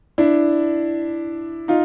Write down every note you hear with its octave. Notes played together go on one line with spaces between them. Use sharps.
D4 E4
D#4 F4